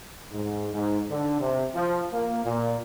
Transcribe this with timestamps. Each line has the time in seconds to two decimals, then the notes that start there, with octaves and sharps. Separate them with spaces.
0.32 G#2
0.74 G#2
1.09 D3
1.41 C3
1.75 F3
2.13 A#3
2.45 A#2